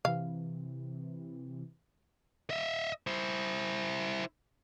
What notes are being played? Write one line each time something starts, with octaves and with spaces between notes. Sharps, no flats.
C3 E3 F5
D#5 E5
E4 C5